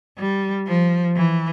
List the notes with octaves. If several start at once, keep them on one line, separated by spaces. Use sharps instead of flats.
G3
F3
E3